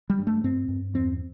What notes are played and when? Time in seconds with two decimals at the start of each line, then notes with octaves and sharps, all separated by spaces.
0.10 G3
0.19 G2
0.27 A3
0.44 G2 C4
0.68 G2
0.94 E2 C4